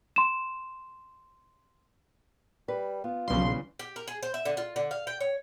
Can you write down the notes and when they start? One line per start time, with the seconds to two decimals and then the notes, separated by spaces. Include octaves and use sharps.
0.16 C6 E7
2.68 G3 B4
3.04 B3 F4
3.28 B1 C#3 E3 G3 C6
3.79 G4
3.96 A#4
4.07 G#4
4.23 C5
4.34 E5
4.45 D3
4.57 F4
4.76 D3
4.91 F5
5.07 G5
5.20 C#5